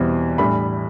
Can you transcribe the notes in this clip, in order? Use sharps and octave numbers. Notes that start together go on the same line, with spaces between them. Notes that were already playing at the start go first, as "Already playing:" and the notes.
Already playing: E2 B2 G3 C4 E4
A2 E3 G3 D4 B5